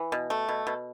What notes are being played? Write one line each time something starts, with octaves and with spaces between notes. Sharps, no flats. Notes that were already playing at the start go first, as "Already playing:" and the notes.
Already playing: E3
B2
A3
B2
B2